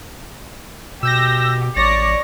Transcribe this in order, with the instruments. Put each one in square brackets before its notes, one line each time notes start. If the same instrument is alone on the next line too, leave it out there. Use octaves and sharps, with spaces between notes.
[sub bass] B2 [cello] G4 [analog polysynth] E6 G6 A#6
[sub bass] A1 [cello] C#5 [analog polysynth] D5 A#6